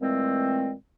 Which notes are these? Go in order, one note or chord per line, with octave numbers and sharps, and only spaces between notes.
A#2 E3 G#3 A3 C4